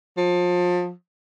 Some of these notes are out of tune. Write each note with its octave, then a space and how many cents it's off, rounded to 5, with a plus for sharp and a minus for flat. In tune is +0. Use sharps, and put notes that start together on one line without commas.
F3 +30